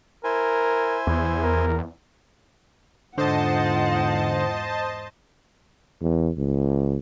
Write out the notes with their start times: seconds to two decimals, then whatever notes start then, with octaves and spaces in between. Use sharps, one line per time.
0.24 E4 A#4 C5 G#5
1.07 E2
1.43 A#4
3.18 E2 G#2 D3 F4 C5 D#5 F#5 A5
6.01 E2
6.38 C#2